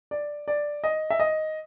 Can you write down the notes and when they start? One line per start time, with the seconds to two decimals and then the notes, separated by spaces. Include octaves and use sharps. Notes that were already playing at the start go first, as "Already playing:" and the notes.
0.11 D5
0.48 D5
0.84 D#5
1.10 E5
1.20 D#5